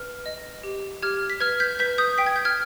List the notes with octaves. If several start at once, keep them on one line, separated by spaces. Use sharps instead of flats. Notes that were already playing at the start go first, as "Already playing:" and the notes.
Already playing: B4 F6
D#5
G4
G4 F6 G#6
B6
B4 F6 G#6
G6 B6
B4 G6 B6
D#6 G6
G5 B6
G#6
G6
F6 G#6